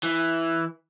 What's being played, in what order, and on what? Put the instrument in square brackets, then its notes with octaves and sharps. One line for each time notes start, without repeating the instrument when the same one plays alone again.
[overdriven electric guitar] E3